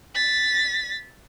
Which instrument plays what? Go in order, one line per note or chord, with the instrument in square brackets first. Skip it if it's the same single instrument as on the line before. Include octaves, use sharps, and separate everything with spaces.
[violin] A6 B6